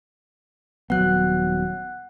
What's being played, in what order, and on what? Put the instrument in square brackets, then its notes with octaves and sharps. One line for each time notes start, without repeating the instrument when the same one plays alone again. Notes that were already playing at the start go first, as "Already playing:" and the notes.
[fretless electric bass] D#1 F#3 B3 [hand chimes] F#5 F#6